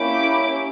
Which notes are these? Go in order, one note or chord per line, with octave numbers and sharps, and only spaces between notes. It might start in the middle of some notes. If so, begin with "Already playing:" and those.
Already playing: A#3 C#4 E4 G4 D6